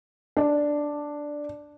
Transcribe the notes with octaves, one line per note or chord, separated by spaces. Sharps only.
D4